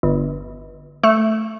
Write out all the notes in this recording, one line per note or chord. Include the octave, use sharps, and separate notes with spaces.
G1
A3